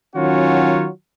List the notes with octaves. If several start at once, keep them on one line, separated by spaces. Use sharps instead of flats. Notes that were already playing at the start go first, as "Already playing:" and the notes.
D#3 F#3 C#4 F4 F#4 C#5